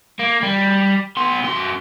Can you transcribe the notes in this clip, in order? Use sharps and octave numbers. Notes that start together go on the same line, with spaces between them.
A#3
G3
B3 C6
F#2 C6